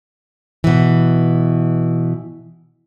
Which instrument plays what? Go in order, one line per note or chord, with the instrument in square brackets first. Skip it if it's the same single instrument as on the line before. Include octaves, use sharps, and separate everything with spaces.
[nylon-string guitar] B2 E3